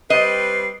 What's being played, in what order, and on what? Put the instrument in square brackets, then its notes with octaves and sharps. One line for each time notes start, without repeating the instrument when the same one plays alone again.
[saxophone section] G3 C4 B4 [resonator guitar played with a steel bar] D#5 [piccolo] C7